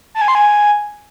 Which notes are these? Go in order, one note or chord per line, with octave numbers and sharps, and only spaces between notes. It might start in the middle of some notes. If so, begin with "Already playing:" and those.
A5
G#5
C6
G#5